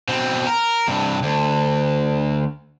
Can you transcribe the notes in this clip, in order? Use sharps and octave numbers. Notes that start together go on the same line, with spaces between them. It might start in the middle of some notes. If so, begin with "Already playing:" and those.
B2 C4
A#4
G2 C3
D2